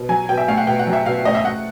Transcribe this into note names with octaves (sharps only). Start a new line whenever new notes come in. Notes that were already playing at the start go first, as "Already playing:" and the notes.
Already playing: B2
F#3 G#5
B2 G5
E5
A3 F5
F#5
B2 G5
F#5
F#3
E5
B2 F5
A3 D#5
E5
A3 F#5